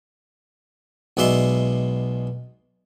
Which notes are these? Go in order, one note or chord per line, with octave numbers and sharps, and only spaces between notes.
B1 B2 G#3 D5 E5 C6